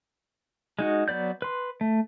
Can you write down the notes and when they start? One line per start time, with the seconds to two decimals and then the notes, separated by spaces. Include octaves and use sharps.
0.79 G#3 D#4 F#4
1.08 F#3 B3 D5 G6
1.42 B4 C6
1.81 A3